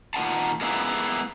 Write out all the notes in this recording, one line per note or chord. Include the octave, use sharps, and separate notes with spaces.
A#2 D#3 A4 F#5 A5
G#3 A#3 B3 D4 E4